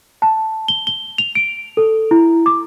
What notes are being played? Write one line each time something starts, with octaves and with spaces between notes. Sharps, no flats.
A5
G7
G7
F7
D7
A4
E4
D6